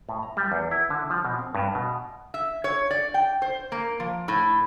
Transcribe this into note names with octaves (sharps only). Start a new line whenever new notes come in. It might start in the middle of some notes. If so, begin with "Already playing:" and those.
A2
A#5
G3
E2
E4
D3
F3
B2
C4
G2
B2
E5
C#5
D5
G5
C5
A#3
F3
A2